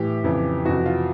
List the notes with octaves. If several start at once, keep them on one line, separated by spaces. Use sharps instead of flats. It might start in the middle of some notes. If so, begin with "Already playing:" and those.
Already playing: A2 E3 G4
F2 C#3 E3
F2 C3 E3 F#4
F4